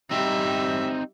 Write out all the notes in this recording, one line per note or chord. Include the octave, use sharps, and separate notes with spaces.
G3 C4 D#4 E5